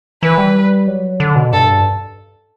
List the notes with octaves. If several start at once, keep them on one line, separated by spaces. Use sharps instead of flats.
E3 B4
G3
F#3
D3
B2
G2 A4